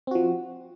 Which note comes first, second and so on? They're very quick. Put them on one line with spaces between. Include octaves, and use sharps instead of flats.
C4 F#4 F3